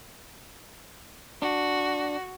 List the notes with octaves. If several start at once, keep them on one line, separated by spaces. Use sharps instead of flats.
D4 F#4